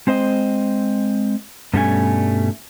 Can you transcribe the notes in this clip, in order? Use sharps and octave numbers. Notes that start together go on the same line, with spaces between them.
G#3 C4 C5 D#5
G2 B2 G3 A3 C#4 G#5